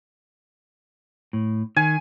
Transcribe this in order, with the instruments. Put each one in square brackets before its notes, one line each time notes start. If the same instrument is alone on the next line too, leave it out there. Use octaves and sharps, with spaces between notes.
[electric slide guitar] A2
[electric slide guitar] D#3 [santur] G#5